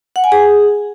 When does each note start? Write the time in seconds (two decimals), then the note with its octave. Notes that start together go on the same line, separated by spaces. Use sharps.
0.16 F#5
0.24 G#5
0.32 G#4